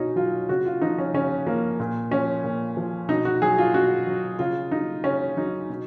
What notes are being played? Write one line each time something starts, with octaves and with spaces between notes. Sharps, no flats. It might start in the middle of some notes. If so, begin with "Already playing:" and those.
Already playing: B2 C#4 D#4
F#3 F4
C#3 F#4
F4
F3 D#4
C#4
C#3 C#4
F3 A#3
A#2
F3 C#4
A#2
F3
B2 D#4
F#4
F#3 G#4
F4
B2 F#4
F#3
C#3 F4
F#3 D#4
C#3 C#4
F#3 D#4
B2